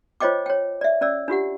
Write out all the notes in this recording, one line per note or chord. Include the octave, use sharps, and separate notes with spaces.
F4 C5 C#5 D#5 G5 D6
C#5 G5
D5 E5
C#4 D5 E6
D4 F4 G4 F#5